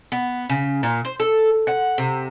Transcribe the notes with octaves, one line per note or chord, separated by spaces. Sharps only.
B3
C#3
A#2
C5
A4
F#5
C3